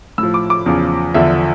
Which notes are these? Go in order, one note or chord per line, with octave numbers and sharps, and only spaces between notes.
A2 F3 E6
D6
D6
E2 C#3 F3
E2 D3 F3 E5